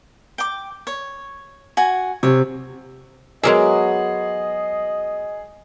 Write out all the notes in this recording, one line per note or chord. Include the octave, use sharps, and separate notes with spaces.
G5 D6
C#5
F#4 G#5
C3 C#5
F#3 G#3 B3 G#4 A#4 D#5 E5 D6